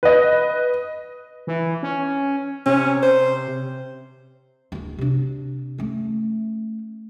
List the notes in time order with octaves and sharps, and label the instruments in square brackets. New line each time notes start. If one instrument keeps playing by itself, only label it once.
[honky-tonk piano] B4 D#5
[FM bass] E3
C#4
[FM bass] C3 [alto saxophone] C#4
[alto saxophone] C5
[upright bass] D1 D2
C3 D4
A3 C#4